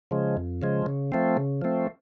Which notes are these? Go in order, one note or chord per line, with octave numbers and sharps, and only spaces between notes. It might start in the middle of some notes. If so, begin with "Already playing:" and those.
C#3 F3 G#3
F2
C#3 F3 G#3
C#3
F3 A3 C4
C#3
F3 A3 C4